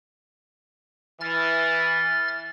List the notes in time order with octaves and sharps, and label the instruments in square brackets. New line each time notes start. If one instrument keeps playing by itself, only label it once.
[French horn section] E3 [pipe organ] F6 A6